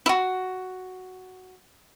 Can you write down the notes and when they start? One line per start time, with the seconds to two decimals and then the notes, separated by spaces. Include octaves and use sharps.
0.06 E4 F#4